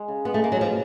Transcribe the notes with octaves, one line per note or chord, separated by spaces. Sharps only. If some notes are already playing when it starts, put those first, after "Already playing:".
Already playing: G#3
C#3
G#3 B3
A3
G#3 A#3
F#3
B2 F3